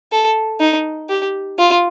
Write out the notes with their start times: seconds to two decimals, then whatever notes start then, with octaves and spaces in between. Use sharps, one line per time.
0.12 A4
0.60 D#4
1.09 G4
1.58 F4